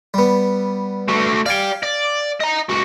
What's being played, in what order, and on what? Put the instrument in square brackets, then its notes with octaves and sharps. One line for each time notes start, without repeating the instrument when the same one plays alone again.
[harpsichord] G3 B3
[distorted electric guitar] A3 F#4
[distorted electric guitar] D5 G5 [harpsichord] F5 G#5
[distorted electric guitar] D5
D#5 A#5
C#2 F#4